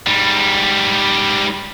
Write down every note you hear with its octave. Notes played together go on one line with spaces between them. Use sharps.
G#2 G3